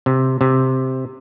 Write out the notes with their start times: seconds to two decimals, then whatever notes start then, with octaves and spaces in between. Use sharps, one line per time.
0.06 C3
0.41 C3